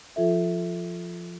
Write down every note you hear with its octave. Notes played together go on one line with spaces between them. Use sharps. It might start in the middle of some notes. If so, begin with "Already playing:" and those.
F3 F4 A4 E5